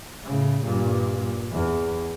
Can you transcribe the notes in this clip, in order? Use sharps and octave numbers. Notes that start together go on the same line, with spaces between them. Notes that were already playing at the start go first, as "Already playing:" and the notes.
A2 C#3
G2 A#2
E2